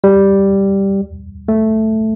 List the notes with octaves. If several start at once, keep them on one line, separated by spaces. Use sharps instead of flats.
G3
A3